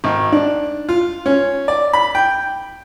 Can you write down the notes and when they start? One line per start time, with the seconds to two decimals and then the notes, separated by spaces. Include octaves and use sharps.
0.04 G#1
0.32 D4
0.89 F4
1.26 C#4
1.68 D5
1.93 B5
2.15 G5